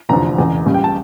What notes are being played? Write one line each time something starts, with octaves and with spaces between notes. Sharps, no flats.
F1 E2 D3 F3 A#5
E1 E2 C#3
C#2 C#3 G3
G5
A5